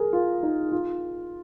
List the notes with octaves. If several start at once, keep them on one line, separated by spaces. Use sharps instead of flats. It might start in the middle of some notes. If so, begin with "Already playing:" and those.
Already playing: G#4 A#4
F4
D#4
F4